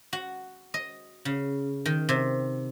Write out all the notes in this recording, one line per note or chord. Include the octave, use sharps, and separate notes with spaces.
F#4
D#5
C#3
D#3
C3